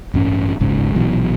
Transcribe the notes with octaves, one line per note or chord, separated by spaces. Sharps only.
A1 G2 C#4
D1 G1 G#2 C#3
A#1 B2 E3 F#3